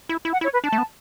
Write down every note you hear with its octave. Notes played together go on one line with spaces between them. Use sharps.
E4
E4
F#5
E4 C#5
B4
D4 A5
A3
B3